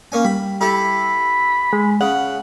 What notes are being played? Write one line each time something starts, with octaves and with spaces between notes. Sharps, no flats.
A#3 C#4 G#5
G3 B5
E4 G4 A4 B5
G#3
C#3 F#5